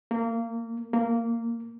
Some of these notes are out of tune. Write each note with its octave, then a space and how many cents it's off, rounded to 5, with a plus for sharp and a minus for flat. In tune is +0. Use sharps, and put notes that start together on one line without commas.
A#3 -25
A#3 -15